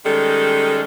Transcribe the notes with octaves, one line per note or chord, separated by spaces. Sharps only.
D#3 G3 G#3 C#4 A4